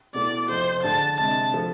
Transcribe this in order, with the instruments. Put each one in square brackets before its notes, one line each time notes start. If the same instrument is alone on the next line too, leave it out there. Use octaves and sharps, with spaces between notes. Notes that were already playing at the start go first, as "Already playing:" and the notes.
[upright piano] B2 A3 E4 [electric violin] D5
[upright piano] F2 C3 F3 A3 [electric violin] C5
[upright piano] D3 A3 D4 G#4 [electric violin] A5
[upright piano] C3 G#3 D4 G#4 [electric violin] A5
[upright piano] F3 A3